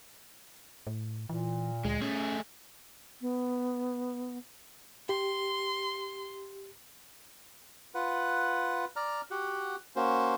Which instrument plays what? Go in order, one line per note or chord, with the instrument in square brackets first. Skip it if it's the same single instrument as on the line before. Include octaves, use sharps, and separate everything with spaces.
[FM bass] A2
[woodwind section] A#2 [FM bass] E3
[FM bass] D2 [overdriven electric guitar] G#3
[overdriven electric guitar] A3 G#4 [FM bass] C#4
[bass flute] B3
[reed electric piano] G4 [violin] C6
[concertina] F4 B4 F#5
D5 A#5 F6
F#4 G4 F#5
A#3 C#4 F#4 C5